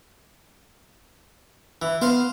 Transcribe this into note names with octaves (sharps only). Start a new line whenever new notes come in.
E3
B3 C5 F5 C6